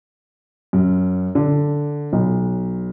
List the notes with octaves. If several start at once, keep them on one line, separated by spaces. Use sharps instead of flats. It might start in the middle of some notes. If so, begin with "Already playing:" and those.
F#2
D3
B1